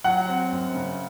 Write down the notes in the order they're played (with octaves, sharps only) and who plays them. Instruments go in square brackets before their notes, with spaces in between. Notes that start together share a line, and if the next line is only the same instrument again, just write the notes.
[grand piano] F#3 [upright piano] F#5
[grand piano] C4
F#2
C#3